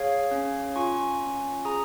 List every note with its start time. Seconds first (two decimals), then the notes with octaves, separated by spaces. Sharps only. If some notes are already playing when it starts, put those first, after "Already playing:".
Already playing: G#4 C#5 F5
0.31 C#4
0.76 F4 G#5 C#6
1.20 C#4
1.65 G#4 A#5 D#6